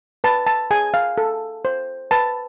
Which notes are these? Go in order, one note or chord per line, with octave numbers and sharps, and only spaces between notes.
B4 A5
A5
G#4 G#5
F5
A4
C5
B4 A5